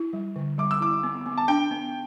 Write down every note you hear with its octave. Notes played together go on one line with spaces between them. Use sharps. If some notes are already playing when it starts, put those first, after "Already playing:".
Already playing: E4
G3
D3
G3 D6
E6
E4 D6
B3
B3
A5
D4 G5
B3